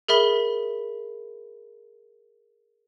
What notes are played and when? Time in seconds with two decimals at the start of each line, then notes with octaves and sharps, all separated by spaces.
0.08 G#4 A#4 E5 B5 G7